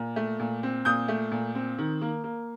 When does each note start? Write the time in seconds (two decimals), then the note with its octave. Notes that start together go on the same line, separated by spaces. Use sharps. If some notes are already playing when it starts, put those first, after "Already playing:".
Already playing: A#2
0.16 A3
0.40 A#2
0.63 C4
0.85 A#2 D#6 G6
1.08 A3
1.31 A#2
1.55 C4
1.78 D#3
2.01 A#3
2.24 A#3